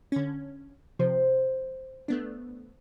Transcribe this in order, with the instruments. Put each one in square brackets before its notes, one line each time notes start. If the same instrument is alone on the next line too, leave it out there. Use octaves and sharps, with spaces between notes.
[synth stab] D3 C#4
[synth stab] C3 F3 [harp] C5
[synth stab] A3 B3 D4